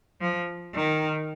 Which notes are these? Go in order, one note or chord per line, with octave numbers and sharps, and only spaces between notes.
F3
D#3